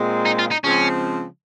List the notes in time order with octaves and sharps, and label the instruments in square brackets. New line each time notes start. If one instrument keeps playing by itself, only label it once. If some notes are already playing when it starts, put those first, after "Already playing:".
Already playing: [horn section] A#2 G#3 C4
[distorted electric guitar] D#4
F4
D#4
[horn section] C#3 F3 G#3 C4 [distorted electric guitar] C#4